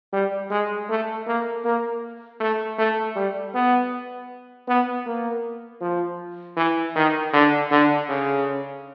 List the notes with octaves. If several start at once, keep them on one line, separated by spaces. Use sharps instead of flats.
G3
G#3
A3
A#3
A#3
A3
A3
G3
B3
B3
A#3
F3
E3
D#3
D3
D3
C#3